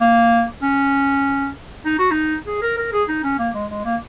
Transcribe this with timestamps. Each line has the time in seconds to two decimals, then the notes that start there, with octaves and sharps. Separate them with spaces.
0.01 A#3
0.63 C#4
1.85 D#4
1.99 F#4
2.11 D#4
2.47 G#4
2.62 A#4
2.78 A#4
2.93 G#4
3.09 D#4
3.24 C#4
3.39 A#3
3.55 G#3
3.71 G#3
3.85 A#3